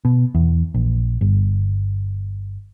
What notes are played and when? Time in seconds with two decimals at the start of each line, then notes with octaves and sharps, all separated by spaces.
0.05 B2
0.35 E2
0.74 A#1
1.21 G1